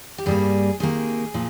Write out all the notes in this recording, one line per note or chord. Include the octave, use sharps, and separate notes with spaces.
G4
G2 G3 A#3 G#4
C3 D#3 A#3 G#4
A#2 F3